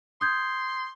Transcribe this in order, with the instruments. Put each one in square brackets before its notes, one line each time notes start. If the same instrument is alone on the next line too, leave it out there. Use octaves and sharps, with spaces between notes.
[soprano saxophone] C6 [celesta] D#6 G6 G#6